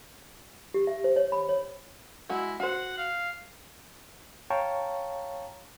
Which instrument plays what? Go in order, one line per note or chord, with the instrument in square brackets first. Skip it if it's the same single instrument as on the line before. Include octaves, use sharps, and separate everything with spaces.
[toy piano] G4
E5
C5
C#5
B5
C#5
[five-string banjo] G#3 F#4 [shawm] E4
[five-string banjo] F#4 C5 [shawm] F#5
[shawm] F5
[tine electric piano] C#5 F5 G5 A5 A#5 C#6